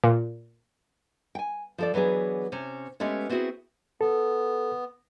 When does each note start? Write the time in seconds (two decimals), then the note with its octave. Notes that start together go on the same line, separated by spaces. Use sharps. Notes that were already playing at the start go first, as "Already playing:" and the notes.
0.04 A#2
1.35 G5 G#5
1.78 F3 A4 D5
1.94 E3 F#3 B3 D4 G#4
2.52 C3 C#4
3.00 G#3 A3 B3 C#4 G4
3.29 B3 C4 E4 F#4 G#4
4.01 B3 A4